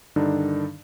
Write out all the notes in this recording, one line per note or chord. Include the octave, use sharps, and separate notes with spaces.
G2 D3 D#3 D4 D#4